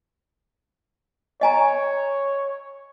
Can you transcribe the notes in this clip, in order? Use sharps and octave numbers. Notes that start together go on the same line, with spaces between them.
C#5 D#5 G#5 A#5